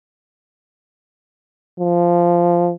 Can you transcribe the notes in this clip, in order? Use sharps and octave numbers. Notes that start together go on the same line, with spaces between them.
F3